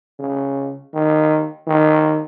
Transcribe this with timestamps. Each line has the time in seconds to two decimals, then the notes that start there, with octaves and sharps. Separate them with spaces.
0.19 C#3
0.94 D#3
1.67 D#3